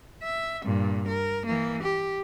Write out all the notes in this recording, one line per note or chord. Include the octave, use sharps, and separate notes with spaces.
E5
G2 A#2
A#4
E3 A#3
G4